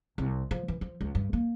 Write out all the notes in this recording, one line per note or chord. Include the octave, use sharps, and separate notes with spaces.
C2
F3
E3
F3
C#2
G2
A#3